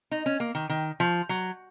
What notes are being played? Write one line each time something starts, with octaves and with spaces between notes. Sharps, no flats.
D#4
C#4
A#3
D#3
D#3
F3
F#3